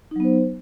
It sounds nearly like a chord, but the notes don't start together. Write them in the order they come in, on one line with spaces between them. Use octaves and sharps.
D#4 F#3 B3 C5